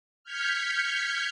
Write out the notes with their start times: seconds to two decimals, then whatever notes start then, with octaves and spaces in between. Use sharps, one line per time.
0.24 F6 G6 G#6 B6 C#7